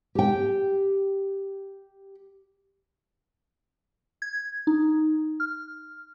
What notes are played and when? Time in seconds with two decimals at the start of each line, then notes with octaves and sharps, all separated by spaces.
0.15 G4 G5
4.22 G#6
4.67 D#4
5.40 F6